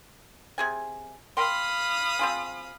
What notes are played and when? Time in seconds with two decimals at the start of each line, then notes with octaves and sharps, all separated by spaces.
0.58 C3 G#4 G#5
1.37 A#4 F5 G5 B5 C6 D#6
2.19 C4 F4 G#4